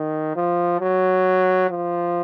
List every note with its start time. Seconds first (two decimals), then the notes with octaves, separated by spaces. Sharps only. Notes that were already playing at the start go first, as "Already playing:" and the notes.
Already playing: D#3
0.36 F3
0.80 F#3
1.69 F3